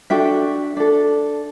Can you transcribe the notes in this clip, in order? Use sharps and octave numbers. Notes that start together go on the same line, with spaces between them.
D4 F#4 A4 E5 G5
D4 A4